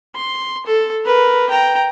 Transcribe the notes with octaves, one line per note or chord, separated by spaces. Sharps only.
C6
A4
A#4 B4
G5 A#5